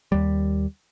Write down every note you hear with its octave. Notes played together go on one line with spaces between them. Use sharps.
D#2 G3